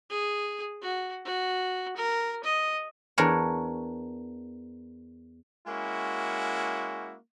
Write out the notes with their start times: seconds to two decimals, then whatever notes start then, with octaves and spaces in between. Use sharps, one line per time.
0.10 G#4
0.82 F#4
1.25 F#4
1.97 A#4
2.44 D#5
3.18 E2 D4 A#4 C#5
5.67 G#3 A#3 C#4 E4 F#4